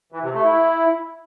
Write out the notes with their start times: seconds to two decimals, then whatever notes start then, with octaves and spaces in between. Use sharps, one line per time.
0.12 E3
0.23 C3
0.34 A3
0.44 E4